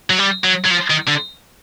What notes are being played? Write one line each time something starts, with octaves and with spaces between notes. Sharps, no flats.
F#3
G3
F#3
F#3
F3
D#3
D3